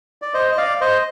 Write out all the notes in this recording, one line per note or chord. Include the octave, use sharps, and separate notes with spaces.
D5
C5 D#5
D#5
D5 F5
C5 D#5